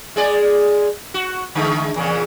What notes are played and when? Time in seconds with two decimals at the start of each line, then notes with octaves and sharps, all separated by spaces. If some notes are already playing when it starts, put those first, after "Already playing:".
0.16 G#3 G#4 D5
1.14 F#4
1.55 D3 G#3 A3
1.96 E2 A#2 C#3